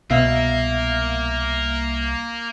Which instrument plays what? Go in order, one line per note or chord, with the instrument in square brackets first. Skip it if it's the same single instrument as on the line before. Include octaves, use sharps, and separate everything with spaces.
[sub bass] C2 [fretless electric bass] B2 [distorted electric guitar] A#3 [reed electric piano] E5 F5